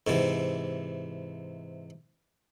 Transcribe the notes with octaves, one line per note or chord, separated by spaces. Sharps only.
G#2 C3 E3